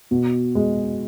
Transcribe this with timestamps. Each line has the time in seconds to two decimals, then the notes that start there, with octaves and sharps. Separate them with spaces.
0.11 B2
0.55 G#3